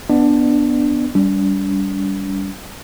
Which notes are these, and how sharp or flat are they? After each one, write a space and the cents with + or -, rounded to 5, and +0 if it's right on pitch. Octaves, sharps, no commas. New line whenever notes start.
B3 +0 D4 +0 D5 +30
G3 +0 D4 -45